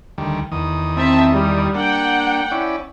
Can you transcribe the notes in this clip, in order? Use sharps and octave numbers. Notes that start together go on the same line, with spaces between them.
D2 D#3 G3
E2 D#3 D#6
C4 E5 A5
G3
A#3 D4 F#5 G5
C#4 E4 D5